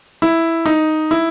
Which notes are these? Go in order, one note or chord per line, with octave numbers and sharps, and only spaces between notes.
E4
D#4
E4